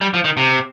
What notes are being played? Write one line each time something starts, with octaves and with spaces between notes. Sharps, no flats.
G3
F3
D#3
C3